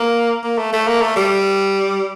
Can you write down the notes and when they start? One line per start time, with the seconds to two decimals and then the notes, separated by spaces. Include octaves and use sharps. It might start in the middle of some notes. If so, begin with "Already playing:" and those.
Already playing: A#3
0.44 A#3
0.58 A3
0.73 A3
0.87 A#3
1.02 A3
1.16 G3